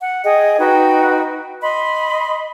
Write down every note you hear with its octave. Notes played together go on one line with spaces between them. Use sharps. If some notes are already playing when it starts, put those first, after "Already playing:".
F#5
G#4 D#5 G5
D#4 F#4 B4 G5
D#5 B5 C6